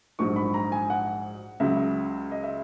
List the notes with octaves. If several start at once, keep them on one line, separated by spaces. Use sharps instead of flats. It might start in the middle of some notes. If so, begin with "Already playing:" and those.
A#1 G#2 F#3 C#6
B5
A#5
G#5
F#5
C#2 C#3 F#3 E5
D#5
E5